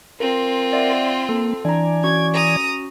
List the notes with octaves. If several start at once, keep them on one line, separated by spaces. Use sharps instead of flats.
C4 F4 A#4
D5 E5 F#5
A#3 A4
E3 D4 D5 G#5 A#5
C#4 F#4 C#6 G#6
A#5 D#6